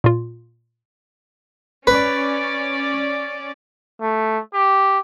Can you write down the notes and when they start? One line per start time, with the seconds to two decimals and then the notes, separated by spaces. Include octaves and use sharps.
0.04 A#2 F4
1.87 C#4 B4 D5
4.02 A3
4.54 G4